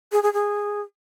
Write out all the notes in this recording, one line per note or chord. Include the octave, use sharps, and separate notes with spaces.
G#4
G#4
G#4